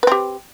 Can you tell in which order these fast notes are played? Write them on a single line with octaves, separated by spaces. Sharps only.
B4 C4 G4